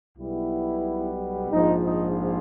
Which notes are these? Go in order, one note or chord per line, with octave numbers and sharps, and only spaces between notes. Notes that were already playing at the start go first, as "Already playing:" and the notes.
B1 B2 G3 B3 E4
A#1 G#2 F3 D#4
D#4